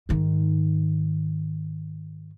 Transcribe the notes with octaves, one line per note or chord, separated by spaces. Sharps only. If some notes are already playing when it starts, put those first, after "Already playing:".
G#2 D#3